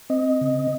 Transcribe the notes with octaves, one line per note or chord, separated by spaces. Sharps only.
C4 D#5
C#3